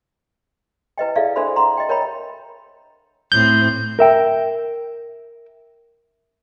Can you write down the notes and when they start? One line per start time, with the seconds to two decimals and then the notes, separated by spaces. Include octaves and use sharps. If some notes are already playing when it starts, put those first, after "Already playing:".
0.98 E4 B4 D#5 G5
1.16 E4 G#4 A4 D5 E5 F5
1.36 D4 F#4 A4 C5 E5 B5
1.56 F#5 A#5 C6
1.77 D#5 G5
1.89 A#4 C#5 G5 A#5 B5
3.32 A2 C4 G6
3.99 A#4 E5 G5